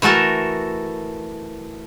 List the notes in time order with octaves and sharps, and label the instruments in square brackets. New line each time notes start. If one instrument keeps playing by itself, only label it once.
[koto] E3 A3 F#4 A4 A#4